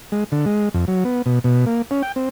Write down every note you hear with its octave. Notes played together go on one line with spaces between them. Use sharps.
G#3
D3
G#3
F2
F#3
B3
B2
B2
A#3
C#4
G5
C4